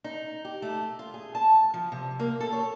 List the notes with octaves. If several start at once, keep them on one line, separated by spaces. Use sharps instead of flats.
D#4
G4
A3
F4
G#4
A5
F3
C3
A#3
A4
C#5